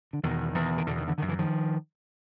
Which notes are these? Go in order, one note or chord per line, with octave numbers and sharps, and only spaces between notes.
D3
E2 B2 D#3
E2 B2
D#3
E2 B2 D3
D#3
D3 E3
F#2 D3 D#3
D3 E3
D#3 F3